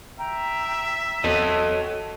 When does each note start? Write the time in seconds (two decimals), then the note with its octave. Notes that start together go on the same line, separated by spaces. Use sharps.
0.18 E5 G5 A#5
1.24 E2 F#4 A4 C#5 D#5